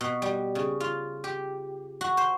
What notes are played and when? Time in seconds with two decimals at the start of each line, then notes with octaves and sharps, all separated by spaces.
0.01 B2
0.22 G3
0.55 C#3
0.80 F4
1.24 G4
2.01 F#4
2.17 C5